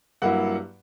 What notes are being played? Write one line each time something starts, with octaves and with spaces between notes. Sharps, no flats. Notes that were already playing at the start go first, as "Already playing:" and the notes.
G2 F#3 A#3 E4 F#5